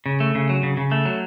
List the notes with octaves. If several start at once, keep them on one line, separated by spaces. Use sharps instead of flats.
C#3
A3
C#3
F#3
C#3
C#3
A3
F#3